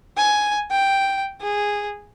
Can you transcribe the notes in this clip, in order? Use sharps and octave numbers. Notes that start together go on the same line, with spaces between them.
G#5
G5
G#4